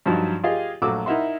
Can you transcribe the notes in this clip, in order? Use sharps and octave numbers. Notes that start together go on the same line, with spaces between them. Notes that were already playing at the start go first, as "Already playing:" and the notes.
G2 F3 F#3 D#4
F4 G4 G#4 D#5 F5
A#1 F#3 A3 F#4 D6 E6
D#4 E4 A#4 E5 F#5 C6